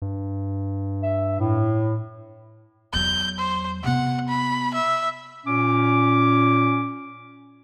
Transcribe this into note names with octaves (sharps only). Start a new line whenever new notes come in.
G2
E5
A2
E2 F#3 G6
C5
C3 B3 F#5
B5
E5
A#2 C#4 D6